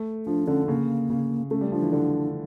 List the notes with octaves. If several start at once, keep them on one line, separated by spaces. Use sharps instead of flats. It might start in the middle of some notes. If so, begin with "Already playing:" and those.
Already playing: A3
F3 D4
D3 C#4
C#3 A#3
C#3
A3 C#4
G3
F3 D4
E3
D3